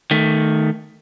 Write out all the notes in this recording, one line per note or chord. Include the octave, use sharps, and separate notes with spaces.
D#3 A3